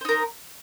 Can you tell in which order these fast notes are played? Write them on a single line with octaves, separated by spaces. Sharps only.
C5 D#4 A#4